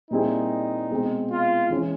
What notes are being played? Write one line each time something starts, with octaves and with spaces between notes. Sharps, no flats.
A#2 G3 C4 D#4 E4 G#4
B2 G#3 C4
F4
E3 G#3 C#4